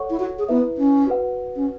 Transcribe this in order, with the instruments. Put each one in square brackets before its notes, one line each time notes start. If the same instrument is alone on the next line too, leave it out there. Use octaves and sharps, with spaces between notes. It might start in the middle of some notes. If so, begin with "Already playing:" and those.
Already playing: [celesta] A4 C#5 F#5 C#6
[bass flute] E4
F#4
G#4
[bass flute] B3 [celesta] E4 B4 E5
[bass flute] C#4
[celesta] F#4 B4 F#5
[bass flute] C#4